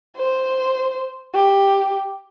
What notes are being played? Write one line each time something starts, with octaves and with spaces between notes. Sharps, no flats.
C5
G4